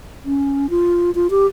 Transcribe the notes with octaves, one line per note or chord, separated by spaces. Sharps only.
C#4
F4
F4
G4